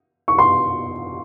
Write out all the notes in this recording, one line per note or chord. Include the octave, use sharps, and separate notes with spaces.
C#6
C6